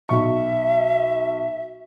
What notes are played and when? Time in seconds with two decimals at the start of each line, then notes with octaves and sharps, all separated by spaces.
0.09 B1 E5 C#6